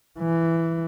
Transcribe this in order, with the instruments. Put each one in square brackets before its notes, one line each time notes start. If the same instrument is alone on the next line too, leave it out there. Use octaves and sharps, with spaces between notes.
[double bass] E3